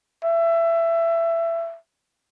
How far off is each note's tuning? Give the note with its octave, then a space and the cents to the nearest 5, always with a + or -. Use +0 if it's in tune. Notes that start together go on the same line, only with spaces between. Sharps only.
E5 +20